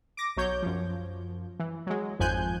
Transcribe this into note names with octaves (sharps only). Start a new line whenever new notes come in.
D6 A#6
B1 F#3 C#5 G6
F#2 F3
E3
F#3 G#3
G#1 F2 F3 G#5 F#6 G6